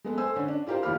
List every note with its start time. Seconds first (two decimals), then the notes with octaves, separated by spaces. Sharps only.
0.04 G#3 B3 A4
0.18 A4 C5 G#5 E6
0.36 D3 C#4
0.48 D4
0.66 E4 F4 G4 A#4 C5
0.83 F#1 D#2 F4 G4 B5 F6